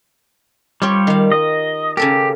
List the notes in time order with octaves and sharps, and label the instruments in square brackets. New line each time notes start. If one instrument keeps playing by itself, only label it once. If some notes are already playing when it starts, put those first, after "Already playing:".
[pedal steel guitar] G3 [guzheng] F4 G4 C#5
[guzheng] D#3 F5
[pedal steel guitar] D#5
[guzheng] C#3 A4 A#4 [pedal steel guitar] G4